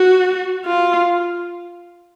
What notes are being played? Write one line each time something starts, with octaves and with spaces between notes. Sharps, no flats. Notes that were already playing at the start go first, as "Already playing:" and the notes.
Already playing: F#4
F4